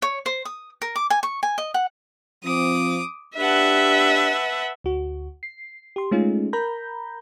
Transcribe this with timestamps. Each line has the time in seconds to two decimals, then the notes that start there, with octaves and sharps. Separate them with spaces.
0.02 C#5
0.26 C5
0.45 D#6
0.82 A#4
0.96 D6
1.10 G#5
1.23 C#6
1.43 G#5
1.58 D#5
1.74 F#5
2.44 F3 C4 D6 D#6
3.38 D4 G4 B4 E5 F#5 A5
4.84 D2 F#4
5.43 C7
5.96 G4 C6
6.11 G#3 A3 C#4 D#4 F4 G#4
6.53 A#4 A#5 B5 G6